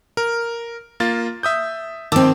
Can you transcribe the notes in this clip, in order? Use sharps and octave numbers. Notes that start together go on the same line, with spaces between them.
A#4
A#3 F4 A6
E5 D#6 G6
D#3 C4 A5 D6 E6